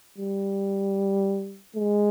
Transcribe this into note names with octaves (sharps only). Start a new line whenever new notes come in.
G3
G#3